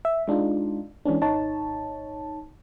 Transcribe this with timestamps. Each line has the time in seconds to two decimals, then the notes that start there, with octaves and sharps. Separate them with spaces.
0.05 E5
0.28 G#3 D4 D#4 F4
1.05 E3 G#3 C#4 D4
1.21 G#1 D#4 C#5 A5